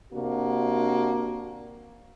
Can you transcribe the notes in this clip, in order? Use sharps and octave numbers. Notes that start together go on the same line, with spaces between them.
C3 A#3 D4 F#4